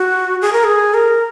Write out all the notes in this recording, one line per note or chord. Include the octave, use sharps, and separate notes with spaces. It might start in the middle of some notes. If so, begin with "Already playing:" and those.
Already playing: F#4
G#4
A#4
G#4
A#4